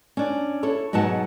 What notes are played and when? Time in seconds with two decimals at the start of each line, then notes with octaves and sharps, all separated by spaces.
0.17 C#4 D4
0.63 E4 A4 C#5
0.93 G#2 B2 F#3 F#5 A5